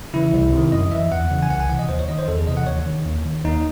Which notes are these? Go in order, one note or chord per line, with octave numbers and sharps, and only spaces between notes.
C#3 E3 E4
C2
C3 D#3
F#2 D#5
E3 E5
E2 F#5
C#3 E3
G#5
C2 F#5
G#5
C3 E3 F#5
D#5
D#2 C5
C#5
D#3 D#5
C5
E2 A4
G#4
C3 E3 D#5
F#5
D#2 C#5
D#3
D#2
D#3
D#2 D#4